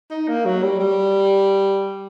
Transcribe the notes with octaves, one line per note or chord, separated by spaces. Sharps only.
D#4
A#3
F#3
G3
G3